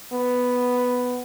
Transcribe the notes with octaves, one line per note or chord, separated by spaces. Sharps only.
B3